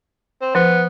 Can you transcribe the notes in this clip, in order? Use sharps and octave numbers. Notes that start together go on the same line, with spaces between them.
C4
F3 B3